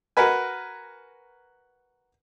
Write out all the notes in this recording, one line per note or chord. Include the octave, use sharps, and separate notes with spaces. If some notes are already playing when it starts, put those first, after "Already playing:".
F#4 A#4 B4 G#5